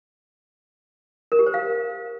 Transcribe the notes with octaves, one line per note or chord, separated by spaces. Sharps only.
A#4
G4
C5
F5